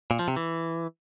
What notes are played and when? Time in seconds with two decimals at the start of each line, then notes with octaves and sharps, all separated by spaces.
0.11 A#2
0.19 F3
0.28 C3
0.36 E3